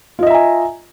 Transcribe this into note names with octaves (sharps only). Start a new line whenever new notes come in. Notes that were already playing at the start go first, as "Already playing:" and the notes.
F4 D#5 E5 G#5 A#5